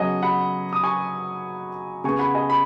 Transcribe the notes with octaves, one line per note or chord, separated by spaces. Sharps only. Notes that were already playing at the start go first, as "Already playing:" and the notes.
Already playing: C#3 F#3 B3 C#5 D#5 F#5 G#5
F#5 B5
D#6
G#5 C#6
C#3 B3 G#5 C#6
F#5 B5
D#5 G#5
B5